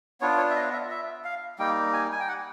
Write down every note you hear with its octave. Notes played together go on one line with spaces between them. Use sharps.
B3 D4 F4 C#5
C#5
E5
D#5
E5
E5
F5
G3 A#3 D#4 G5
G#5
G#5
G5
F#5